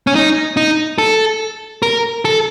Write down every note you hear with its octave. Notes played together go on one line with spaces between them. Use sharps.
C#4
D#4
D#4
A4
A#4
A4